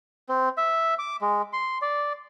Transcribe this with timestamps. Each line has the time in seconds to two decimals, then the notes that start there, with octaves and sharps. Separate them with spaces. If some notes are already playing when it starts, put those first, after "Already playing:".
0.29 C4
0.57 E5
0.99 D6
1.21 G#3
1.53 C6
1.82 D5